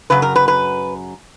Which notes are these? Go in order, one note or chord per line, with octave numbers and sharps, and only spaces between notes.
F#2 C#3 B4
A#4
B4
B4